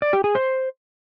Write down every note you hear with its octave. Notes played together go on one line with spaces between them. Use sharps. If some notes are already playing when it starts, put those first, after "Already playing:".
D5
G4
G#4
C5